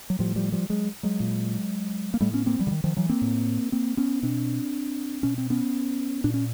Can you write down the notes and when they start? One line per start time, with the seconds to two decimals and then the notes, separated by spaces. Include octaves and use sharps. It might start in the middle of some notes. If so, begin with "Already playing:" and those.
0.10 F#3
0.19 A2 F3 G3
0.35 F3 G3
0.52 F3 G3
0.69 F#3 G#3
1.03 F#3 G#3
1.20 A#2
2.14 A#3
2.21 A2 G3 A3
2.33 B3 C#4
2.46 A#3 C4
2.59 F3 G3
2.67 D3
2.71 D#3
2.84 D#3 F3
2.97 E3 F#3
3.09 A#3 C4
3.21 A2
3.72 A#3 C4
3.97 B3 C#4
4.23 B2 C4 D4
5.23 B2 C#4
5.38 C4
5.50 B3 C#4
6.24 A#2 D4
6.34 C#4